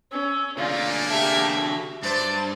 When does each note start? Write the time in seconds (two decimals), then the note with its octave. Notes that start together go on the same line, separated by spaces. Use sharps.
0.11 C#4 E6
0.58 D3 G3 A3 A#3 F4 G#4 D5
1.09 G4 E5 A5
1.60 F#4
2.03 G2 C5 D5 A5